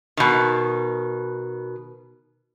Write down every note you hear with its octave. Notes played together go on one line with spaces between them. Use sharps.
B2 D#3